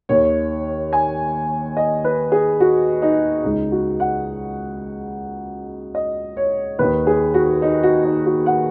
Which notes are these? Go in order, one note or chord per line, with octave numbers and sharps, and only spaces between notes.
D#2 D#3 C#5
G#5
D#5
B4
G#4
F#4
D#4
C#2 C#3 D#4
F#4
F#5
D#5
C#5
D#2 D#3 B4
G#4
F#4
D#4
F#4
D#4
F#4
F#5